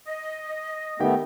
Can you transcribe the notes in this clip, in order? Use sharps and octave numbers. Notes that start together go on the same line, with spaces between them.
D#5
D#3 A3 B3 G4 G5